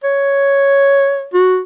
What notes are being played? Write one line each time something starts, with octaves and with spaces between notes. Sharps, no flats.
C#5
F#4